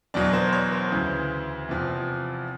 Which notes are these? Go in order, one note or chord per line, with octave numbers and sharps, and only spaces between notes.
E2 B2 F#3 D4 D5
C5
C#5
C5
D2 C#3 E3
E2 C3 F3